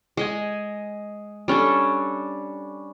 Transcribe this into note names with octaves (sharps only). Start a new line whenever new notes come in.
G#3 D#5 G#5
G3 C#4 D4 A4